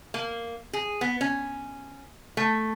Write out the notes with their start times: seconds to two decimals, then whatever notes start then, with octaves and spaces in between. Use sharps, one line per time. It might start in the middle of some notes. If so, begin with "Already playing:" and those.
0.14 A#3
0.73 G#4
1.01 B3
1.21 C#4
2.37 A3